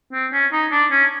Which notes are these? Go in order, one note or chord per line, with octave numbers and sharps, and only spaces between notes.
C4
C#4
D#4
D4
C#4